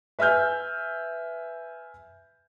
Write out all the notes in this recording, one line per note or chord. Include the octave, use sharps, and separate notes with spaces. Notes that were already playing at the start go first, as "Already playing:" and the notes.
B4 E5 G#5 F6 G6